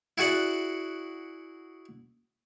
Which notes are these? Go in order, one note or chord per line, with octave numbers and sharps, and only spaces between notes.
E4 F#4 G#4 D5 F#5